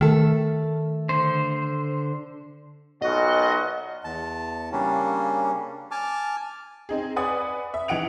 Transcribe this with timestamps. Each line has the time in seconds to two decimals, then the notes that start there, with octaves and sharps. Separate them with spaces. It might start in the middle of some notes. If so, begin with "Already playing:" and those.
0.01 D#3 A3 A4
1.09 D3 C5
3.02 B1 A#2 F#4 D#5
4.04 E2 A5
4.72 C#3 G3 A#3 C#4 D4
5.91 G#5 A5 D6 F6
6.89 C4 D#4 G#4
7.16 B4 D5 F#5 G#5 D#6
7.74 E5
7.88 E3 D#4 F#5 D7 F7